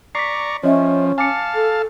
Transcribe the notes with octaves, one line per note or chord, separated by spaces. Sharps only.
D5 A#5 C#6 B6 C7
F3 C#4 C#5 D#5 E5
F5 G#5 A5 D6 C#7
A4